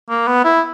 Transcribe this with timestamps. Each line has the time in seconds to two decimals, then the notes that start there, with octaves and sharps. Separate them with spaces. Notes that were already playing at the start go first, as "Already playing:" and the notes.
0.09 A#3
0.27 B3
0.45 E4